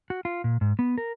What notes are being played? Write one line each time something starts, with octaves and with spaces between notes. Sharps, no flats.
F#4
F4
A#2
G#2
B3
A#4